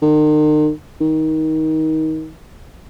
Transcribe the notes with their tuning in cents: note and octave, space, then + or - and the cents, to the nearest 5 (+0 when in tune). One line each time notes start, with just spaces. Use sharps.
D#3 -40
D#3 +20